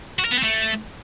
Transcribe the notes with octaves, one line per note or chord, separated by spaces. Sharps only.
F#4
A#4
B3
C4
A3